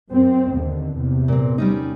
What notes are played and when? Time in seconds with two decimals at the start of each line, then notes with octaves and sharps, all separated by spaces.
0.11 F#2 C4
0.52 D#2 D3
0.96 E2 C3
1.28 A#2 C4
1.58 G3 C#4 D#4